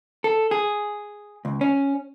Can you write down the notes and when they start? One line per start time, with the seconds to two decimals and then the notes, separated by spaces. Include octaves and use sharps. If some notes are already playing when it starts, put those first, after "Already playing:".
0.24 A4
0.51 G#4
1.45 C#2
1.61 C#4